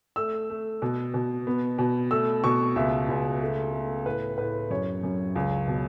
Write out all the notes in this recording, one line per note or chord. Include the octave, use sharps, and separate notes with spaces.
A3 E6
A3
B2
B2
B3
B2
A3 E6
B2 C#6
C#2 E5
C#2
A3
A3
A2 B4
A2 B4
F#2 C#5
F#2
C#2
B2